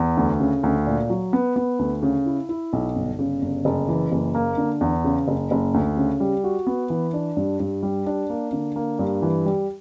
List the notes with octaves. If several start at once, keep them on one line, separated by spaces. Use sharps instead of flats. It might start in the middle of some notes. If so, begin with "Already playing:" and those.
Already playing: E2
D2
C#3
D2
A#2
F#3
B3
B3
D2
C#3
E4
E4
B1
G1
C#3
G1
F#1
E3
F#1
A#3
D3
E2
C#3
F#1
F#1
D2
C#3
G3
F#4
B3
E3
D4
G2
G2
G3
D4
A#3
D3
A#3
G2
E3
G3